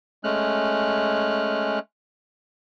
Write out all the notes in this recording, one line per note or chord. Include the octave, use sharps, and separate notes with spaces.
G#3 A3 C#4 F6 F#6